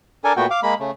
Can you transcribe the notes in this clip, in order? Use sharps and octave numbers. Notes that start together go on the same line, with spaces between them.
D4 A4 A#4 G#5
A#2 A3 B3 F#4 G5
F5 D6
G#3 A#3 B5
C#3 A3